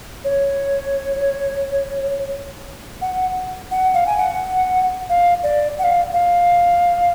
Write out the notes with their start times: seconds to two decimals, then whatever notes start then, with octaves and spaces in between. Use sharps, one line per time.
0.24 C#5
3.02 F#5
3.71 F#5
3.94 F5
4.07 G#5
4.18 F#5
5.10 F5
5.43 D5
5.79 F#5
5.84 F5
6.12 F5